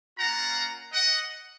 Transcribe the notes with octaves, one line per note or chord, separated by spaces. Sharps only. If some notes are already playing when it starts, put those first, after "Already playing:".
A#3 C#4 F4 F#5 A#5
D#5 F#5